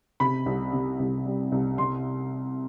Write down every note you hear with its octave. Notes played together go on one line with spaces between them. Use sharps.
C3 B5
C2
C3
C2
G3
C2
C3 C6